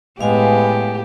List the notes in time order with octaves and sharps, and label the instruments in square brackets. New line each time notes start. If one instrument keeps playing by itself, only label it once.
[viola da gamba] A2 G4 [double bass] G#3 B3 [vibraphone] F5 G#5